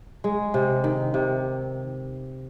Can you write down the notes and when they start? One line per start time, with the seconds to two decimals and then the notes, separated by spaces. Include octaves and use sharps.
0.24 G#3
0.54 C3
0.84 D#3
1.14 C3